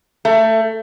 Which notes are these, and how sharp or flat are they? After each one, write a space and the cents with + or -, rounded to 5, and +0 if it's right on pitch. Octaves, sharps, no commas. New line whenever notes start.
A3 +20